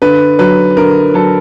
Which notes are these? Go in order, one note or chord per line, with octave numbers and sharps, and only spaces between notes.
D3 B4
F#3 B4
D3 A#4
F#3 A4